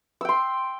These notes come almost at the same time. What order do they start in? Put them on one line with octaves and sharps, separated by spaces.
E6 G5 C6